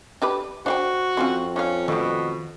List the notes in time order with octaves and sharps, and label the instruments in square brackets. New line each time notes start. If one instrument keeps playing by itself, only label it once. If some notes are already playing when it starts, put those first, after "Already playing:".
[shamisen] D4 G4 B4
[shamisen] D4 F5 G5 [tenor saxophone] F#4 [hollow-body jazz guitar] C5
[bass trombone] F2 [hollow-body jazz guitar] C4 C6 [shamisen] C#4 F4
[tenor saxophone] C#4 [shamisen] D4 F5
[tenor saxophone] B2 [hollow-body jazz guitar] D#3 [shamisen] A3 D4